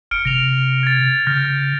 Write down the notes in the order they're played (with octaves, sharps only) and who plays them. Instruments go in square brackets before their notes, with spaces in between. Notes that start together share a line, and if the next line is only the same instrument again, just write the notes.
[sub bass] F1 [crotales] F6 C#7 D7
[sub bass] C3 [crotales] A#6 F7
[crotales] G#6 A6
[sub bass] C#3 [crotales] F6 G6 A#6